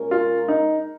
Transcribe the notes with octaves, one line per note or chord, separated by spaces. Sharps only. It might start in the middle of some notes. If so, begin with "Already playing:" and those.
Already playing: A#2 G#3 C#4 A#4
F4
D#4